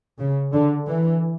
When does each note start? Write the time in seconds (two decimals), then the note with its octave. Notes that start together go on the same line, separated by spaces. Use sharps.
0.19 C#3
0.53 D3
0.87 E3